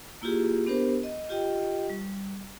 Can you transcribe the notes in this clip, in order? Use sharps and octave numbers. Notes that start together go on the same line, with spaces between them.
A#3 E4 F4 G4 G#4
B3 D4 G4 A#4 C5
D#5
F4 G4 D#5 G5
G3